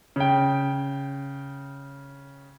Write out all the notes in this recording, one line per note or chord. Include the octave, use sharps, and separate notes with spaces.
C#3 G5